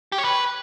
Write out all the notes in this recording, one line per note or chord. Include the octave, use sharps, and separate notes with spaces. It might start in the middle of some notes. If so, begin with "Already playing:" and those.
G4
C#5
B4